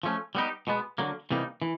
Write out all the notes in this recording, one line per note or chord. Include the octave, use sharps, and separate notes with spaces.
F3 A3 C#4
G3 B3 D#4 G4
B2 G#3 B3
D3 F#3 A#3
C3 E3 G3 A#3 D#4
E3